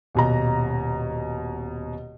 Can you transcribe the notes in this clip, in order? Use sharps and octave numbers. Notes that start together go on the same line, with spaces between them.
D#1 B2 A#5